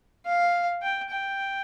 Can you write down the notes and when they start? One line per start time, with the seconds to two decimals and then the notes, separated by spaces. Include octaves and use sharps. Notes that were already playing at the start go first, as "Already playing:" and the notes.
0.26 F5
0.82 G5
1.11 G5